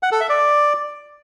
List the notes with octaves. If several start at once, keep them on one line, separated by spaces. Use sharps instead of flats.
F#5
A4
E5
D5